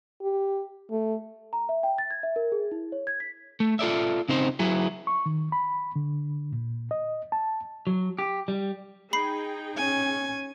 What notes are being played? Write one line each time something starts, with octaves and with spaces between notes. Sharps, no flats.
G4
A3
A#5
E5
G5
A6
G#6
E5
A#4
G#4
E4
C#5
G#6
B6
A3
F4 A4 D5 E5
C#3 C4 D#4 C5
F#3 E4 G#4
C#6
D#3
B5
D3
A#2
D#5
A5
F#3
G4
G3
D#4 G#4 G5 B5 C7
C#4 G#5